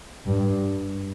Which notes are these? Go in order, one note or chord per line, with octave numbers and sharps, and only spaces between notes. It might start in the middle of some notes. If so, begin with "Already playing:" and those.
G2